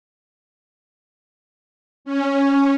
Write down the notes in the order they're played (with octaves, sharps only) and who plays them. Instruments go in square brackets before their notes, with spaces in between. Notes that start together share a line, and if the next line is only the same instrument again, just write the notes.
[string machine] C#4